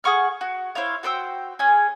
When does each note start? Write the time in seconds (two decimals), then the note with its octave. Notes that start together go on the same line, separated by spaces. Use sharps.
0.04 G#4 F#5 C#6 F6
0.41 F#4
0.75 E4 C5 C#5 F5
1.03 F#4 C5 G5 E6
1.59 C#4 G#4